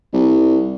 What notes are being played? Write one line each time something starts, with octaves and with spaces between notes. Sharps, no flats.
C2